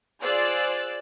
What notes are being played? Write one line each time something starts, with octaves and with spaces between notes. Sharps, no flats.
F4 G#4 C5 D5 E6 F#6